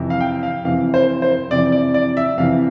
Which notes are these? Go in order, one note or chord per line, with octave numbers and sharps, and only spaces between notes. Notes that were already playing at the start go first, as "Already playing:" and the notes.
Already playing: F2 C3 E3
F5
G5
F5
F2 C3 E3 F5
C5
C5
F2 C3 E3 D5
D5
D5
E5
F2 C3 E3 F5